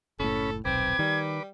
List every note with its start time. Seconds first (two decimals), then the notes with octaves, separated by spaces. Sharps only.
0.20 F#1 A2 C#4 A4 B5
0.65 D#1 B1 C4 B4 D6 G#6
0.99 D#3 G3